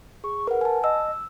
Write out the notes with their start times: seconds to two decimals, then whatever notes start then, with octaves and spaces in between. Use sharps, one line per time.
0.24 G#4 C#6
0.47 A#4 B4 F#5
0.61 G#5 A5
0.84 D#5 E6